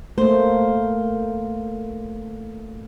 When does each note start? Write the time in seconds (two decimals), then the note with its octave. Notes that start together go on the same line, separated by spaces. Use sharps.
0.18 A3 A#3 C5